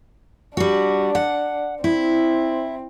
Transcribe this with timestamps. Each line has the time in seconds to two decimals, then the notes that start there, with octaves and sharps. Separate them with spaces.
0.57 G3 D4 F#4
1.15 F#5
1.84 C4 E4